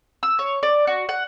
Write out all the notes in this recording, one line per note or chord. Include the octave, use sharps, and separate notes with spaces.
E6
C#5
D5
F#4
F#5